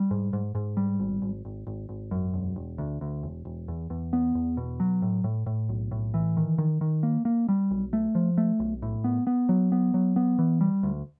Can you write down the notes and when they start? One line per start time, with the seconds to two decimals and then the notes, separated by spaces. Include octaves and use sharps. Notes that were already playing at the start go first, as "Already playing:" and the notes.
Already playing: G3
0.11 G#2
0.33 G#2
0.55 G#2
0.77 G3
1.00 G#1
1.22 G#1
1.45 G#1
1.67 G#1
1.89 G#1
2.11 F#2
2.34 E1
2.56 E1
2.78 D2
3.01 D2
3.23 E1
3.45 E1
3.68 E2
3.90 E2
4.13 B3
4.35 E2
4.57 B2
4.80 F#3
5.02 A2
5.24 A2
5.46 A2
5.69 B1
5.91 A2
6.14 E3
6.37 D#3
6.58 D#3
6.81 D#3
7.03 A#3
7.25 A#3
7.49 G3
7.71 B1
7.93 A3
8.15 F3
8.38 A3
8.60 B1
8.82 A2
9.04 B3
9.27 B3
9.49 F#3
9.72 B3
9.94 F#3
10.16 B3
10.39 E3
10.61 G3
10.83 D2